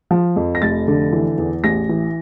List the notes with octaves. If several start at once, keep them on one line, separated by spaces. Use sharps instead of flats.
F3
F2
A#6
F1 A6
D3
E3
E2
A1 A#6
E3